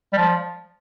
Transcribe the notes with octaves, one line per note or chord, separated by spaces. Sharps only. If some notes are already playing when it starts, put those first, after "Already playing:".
G3
F3